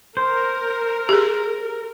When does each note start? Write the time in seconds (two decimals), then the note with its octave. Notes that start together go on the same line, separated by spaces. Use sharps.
0.17 A#4 C5
1.09 G4 G#4